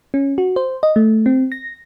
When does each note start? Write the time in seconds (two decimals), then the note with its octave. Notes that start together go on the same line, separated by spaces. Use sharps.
0.14 C#4
0.38 F#4
0.56 C5
0.83 D#5
0.96 A3
1.26 C4
1.52 A#6